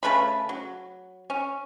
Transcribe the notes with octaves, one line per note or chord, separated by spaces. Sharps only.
C#3 A3 B4 B5
F#3
C#4